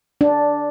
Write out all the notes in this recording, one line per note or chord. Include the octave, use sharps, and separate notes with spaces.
D4